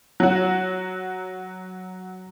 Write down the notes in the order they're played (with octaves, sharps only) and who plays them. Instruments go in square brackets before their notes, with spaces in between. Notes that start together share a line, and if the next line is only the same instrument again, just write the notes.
[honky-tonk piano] F#3 F#4